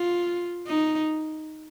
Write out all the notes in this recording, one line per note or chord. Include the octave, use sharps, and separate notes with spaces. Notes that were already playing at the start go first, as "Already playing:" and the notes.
Already playing: F4
D#4